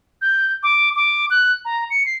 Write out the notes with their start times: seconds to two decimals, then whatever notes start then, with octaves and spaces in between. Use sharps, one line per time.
0.22 G6
0.63 D6
0.96 D6
1.30 F#6
1.65 A#5
1.90 C#7
2.06 C7